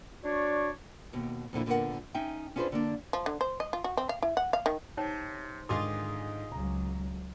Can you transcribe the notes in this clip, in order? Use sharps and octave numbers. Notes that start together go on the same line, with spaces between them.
D4 F#4 C#5 D5
D#2 B2
F2 A#2 D3 E4
A#2 D3 B3 A#4 F#5
C#4 D#4 E5 G5
C#4 D4 F4 G#4 B4 C5
D3 A#3 D4
F3
D3
C5
D#5
F4
F#4
C4
F5
E4
F#5
F5
D#3
C3 D#4 C#5 G5
G#2 D3 D#3 F4 G#4 C6 D6
C#2 F#3 A#5